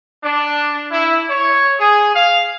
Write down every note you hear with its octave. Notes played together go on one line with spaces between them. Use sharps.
D4
E4
C#5
G#4
F5